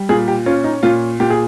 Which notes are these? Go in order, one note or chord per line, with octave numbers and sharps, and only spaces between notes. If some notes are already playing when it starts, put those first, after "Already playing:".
Already playing: G3
A#2 G#4
G4
C#4 F4
D#4
A#2 F4
A#2 G4
G#4